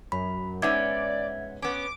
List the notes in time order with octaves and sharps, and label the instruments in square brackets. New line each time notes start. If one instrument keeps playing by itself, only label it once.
[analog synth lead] F#2 [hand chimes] B5
[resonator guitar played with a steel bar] G#2 B3 C#4 [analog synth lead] D5 [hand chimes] E5 G#6
[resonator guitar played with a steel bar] B3 C#4 [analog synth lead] D6